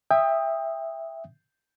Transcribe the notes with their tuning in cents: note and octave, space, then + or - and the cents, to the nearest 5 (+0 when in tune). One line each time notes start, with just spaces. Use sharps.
E5 +0 G5 +25 D#6 +0